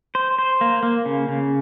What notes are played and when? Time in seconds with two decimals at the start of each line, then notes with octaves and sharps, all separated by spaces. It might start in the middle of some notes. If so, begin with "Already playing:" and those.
0.15 C5
0.39 C5
0.61 A#3
0.83 A#3
1.05 C#3
1.28 C#3